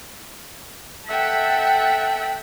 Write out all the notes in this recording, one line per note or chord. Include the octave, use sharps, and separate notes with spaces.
A4 E5 F#5 G5